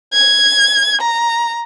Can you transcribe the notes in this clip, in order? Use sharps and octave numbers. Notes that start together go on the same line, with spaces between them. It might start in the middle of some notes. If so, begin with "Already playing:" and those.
G#6
A#5